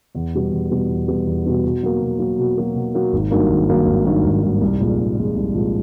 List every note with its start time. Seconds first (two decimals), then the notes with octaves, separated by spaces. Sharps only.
0.15 E2
0.34 B2 G3 B3
0.52 E2
0.71 B2 G3 B3
0.89 E2
1.08 B2 G3 B3
1.26 E2
1.45 B2 G3 B3
1.64 B2
1.83 F#3 A#3
2.01 B2
2.19 F#3 A#3
2.39 B2
2.57 F#3 A#3
2.75 B2
2.94 F#3 A#3
3.13 G#1
3.31 G2 D#3 F#3 A#3
3.49 G#1
3.68 G2 D#3 F#3 A#3
3.87 G#1
4.06 G2 D#3 F#3 A#3
4.24 G#1
4.43 G2 D#3 F#3 A#3
4.61 C2
4.80 A#2 F3 G#3
4.98 C2
5.17 A#2 F3 G#3
5.36 C2
5.54 A#2 F3 G#3